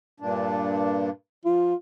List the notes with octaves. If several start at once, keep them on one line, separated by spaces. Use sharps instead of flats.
G2 A#2 D4
F3 F4